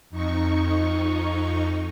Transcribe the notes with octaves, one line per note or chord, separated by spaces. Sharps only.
F2 D#4 C#6